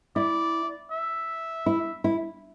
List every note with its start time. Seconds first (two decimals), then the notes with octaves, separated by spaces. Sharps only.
0.16 E4 D5
0.92 E5
1.66 E4
2.04 E4